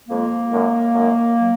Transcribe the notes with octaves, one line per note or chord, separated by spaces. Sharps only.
F2 F3 G#3 A#3
F#2 D#3 G#3
F#2 D#3 G#3
F#3